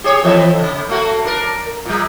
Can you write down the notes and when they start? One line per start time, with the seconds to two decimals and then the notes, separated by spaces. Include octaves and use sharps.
0.04 G4 G#4 C#5
0.24 F2 E3 E5
0.59 C#3
0.89 A3 A#3 F#4
1.24 D4 A#4
1.86 A#2 G3